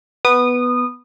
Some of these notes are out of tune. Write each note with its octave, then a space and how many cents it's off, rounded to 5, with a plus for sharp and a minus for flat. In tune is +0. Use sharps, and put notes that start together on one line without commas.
B3 +0 B4 +0 D#6 -20